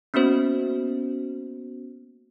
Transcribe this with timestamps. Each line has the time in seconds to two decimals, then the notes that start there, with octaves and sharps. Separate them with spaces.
0.14 A#3 B3 C#4 F#4 C5